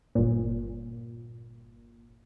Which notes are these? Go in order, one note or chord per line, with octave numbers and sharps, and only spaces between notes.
G1 A#2